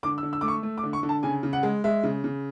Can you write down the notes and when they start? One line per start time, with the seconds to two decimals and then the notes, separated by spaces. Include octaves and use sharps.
0.03 D3 D6
0.18 E6
0.23 D3
0.33 E6
0.41 A3 D6
0.48 C#6
0.63 A3
0.78 D6
0.84 D3
0.93 C#6
1.03 D3
1.09 A5
1.23 C#3 G#5
1.43 C#3
1.53 F#5
1.63 G#3
1.84 G#3 E5
2.04 C#3
2.24 C#3